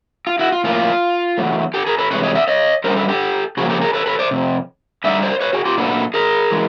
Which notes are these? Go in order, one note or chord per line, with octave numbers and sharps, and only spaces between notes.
F4
E4 F#4
F4
A2 F3 A#3 F4
E2 B2 F#3 A3
G4 A4
G#4 A#4
A4 B4
C3 E3 G#3 B4 C#5
C#5 D#5
D5 E5
C#5 D#5
F#2 D3 G3 B3 A#4 C5
A4 B4
G4 A4
C#3 F3 A#3 F#4 G#4
G4 A4
G#4 A#4
A4 B4
A4 B4
C5 D5
F2 C3
D3 G3 C4 D#4 D5 E5
C5 D5
B4 C#5
F#4 G#4
F4 G4
A#2 F#3 A3 D4 A4 B4
G#4 A#4
E3 G#3